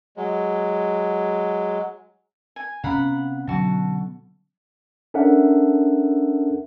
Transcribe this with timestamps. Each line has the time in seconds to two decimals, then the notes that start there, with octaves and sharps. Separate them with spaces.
0.17 F#3 G#3
2.56 G#5
2.84 C3 B3 C#4 F5 F#5 A#5 B5
3.48 B2 D3 F#3 F#4 A5
5.14 C#4 D4 A4 A#4 E5 F#5